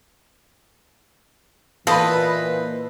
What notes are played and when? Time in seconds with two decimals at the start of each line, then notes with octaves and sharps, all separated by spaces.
1.87 A#2 E3 A4 B4 C5 D#5 F5 B5